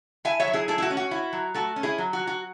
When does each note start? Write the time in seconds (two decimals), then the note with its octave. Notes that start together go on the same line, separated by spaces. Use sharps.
0.25 E4 E5 G#5
0.40 C#5 E5
0.47 F#3
0.53 E4 G#4
0.68 A3 E4 G#4
0.78 E4
0.82 F#4
0.90 C#4
0.97 F#4
1.11 E4
1.33 F#3
1.54 A3 F#4
1.76 C#4
1.83 E4 G#4
1.98 F#3
2.13 F#4
2.19 F#3
2.27 F#4